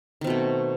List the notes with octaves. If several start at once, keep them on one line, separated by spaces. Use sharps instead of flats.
B2 D#3 A3 C4